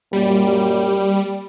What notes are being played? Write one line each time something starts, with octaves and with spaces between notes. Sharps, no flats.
F#2 A#2 G3 A#3